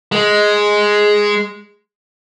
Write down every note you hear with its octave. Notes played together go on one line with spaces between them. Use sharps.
G#3